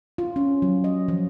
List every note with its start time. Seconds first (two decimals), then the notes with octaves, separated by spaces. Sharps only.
0.18 F4
0.36 C#4
0.62 F#3
0.84 D#5
1.08 F3